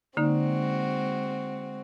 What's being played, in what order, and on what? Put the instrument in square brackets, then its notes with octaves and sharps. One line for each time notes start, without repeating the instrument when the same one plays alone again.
[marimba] D3 A#3 D#4 [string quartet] G#3 C4 F#4